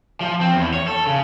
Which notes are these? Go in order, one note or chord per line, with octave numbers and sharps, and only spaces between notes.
F3
C4
E2
C#5
A4
C#3